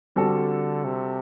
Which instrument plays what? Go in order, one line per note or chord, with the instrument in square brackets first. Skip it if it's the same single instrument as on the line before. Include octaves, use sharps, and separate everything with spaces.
[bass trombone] D3 [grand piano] G3 C4 F#4 A4
[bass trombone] C3